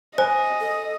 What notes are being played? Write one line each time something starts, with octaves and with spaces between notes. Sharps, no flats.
C5 D#5 G#5
A4